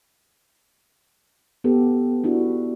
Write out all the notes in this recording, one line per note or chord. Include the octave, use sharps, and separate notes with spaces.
B3 G4 A4 B4
D4 E4 F#4